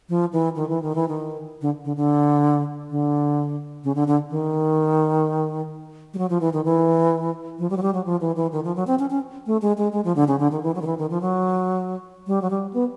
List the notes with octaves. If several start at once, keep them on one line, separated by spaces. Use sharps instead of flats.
F3
E3
D#3
E3
D#3
E3
D#3
D3
D3
D3
D3
C#3
D3
D3
D#3
G3
F#3
F3
E3
D#3
E3
F3
G3
F#3
G3
F#3
F3
E3
E3
D#3
F3
F#3
C4
C#4
C#4
A3
G#3
G#3
G#3
F3
D3
C#3
D3
D#3
E3
F#3
D#3
E3
D#3
F3
F#3
G3
F#3
G3
B3